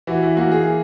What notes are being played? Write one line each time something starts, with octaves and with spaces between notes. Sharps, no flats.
E3 F#4
E4
A#3 F#4
G#4